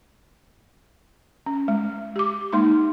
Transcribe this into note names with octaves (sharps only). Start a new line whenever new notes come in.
C#4
G#3
G4 D6
G#3 A#3 D#4 C6